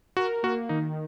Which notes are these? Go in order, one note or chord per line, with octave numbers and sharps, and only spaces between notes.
F#4 A#4
A#3 F#4
D#3 D#4